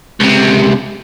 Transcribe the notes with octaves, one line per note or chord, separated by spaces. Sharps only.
C#2 C3